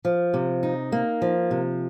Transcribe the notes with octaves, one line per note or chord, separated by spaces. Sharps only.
F3
C3
D#4
A#3
F3
C3